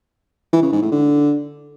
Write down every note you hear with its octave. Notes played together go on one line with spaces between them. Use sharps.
E3
C#3
G#2
A2
D3